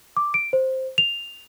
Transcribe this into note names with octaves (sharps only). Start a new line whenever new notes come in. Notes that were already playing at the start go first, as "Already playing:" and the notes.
D6
D7
C5
F7